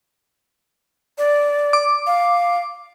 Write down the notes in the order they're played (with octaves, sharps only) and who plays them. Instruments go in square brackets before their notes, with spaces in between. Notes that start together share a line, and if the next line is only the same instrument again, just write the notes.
[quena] D5
[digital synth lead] D6
[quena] F5